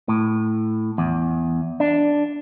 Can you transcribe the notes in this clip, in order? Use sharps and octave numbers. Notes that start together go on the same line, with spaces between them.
A2
E2
D4